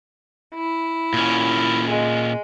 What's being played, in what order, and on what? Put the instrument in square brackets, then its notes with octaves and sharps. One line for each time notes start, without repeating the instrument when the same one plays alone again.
[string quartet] E4
[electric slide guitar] A#2 C#4
[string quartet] G#3